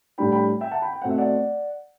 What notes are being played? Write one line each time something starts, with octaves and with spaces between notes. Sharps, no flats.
A2 G3 D4 G5 B5
G5 B5
E5 G5
F#5 A5
G5 B5
G5
B2 A3 C4 F#5
E5
D5 F#5